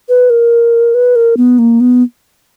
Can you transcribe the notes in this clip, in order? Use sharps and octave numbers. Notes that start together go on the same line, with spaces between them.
B4
A#4
B4
A#4
B3
A#3
B3